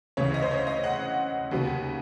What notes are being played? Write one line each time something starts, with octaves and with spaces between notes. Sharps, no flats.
D2 C#3 E3 C#5
D#5
C5
C#5
D#5
F#5
D#2 C#3 F#3 B3